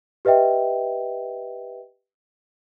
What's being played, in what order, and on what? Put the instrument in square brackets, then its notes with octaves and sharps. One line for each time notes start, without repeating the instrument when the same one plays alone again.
[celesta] G4 B4 D#5 E5 G5